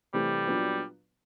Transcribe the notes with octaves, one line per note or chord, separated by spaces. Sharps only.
C3 E3 G3 A3
A#2 F#3 B3 D4